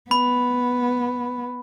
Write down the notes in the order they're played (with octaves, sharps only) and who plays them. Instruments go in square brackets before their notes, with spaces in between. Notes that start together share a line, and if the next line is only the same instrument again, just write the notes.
[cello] B3 [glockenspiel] B5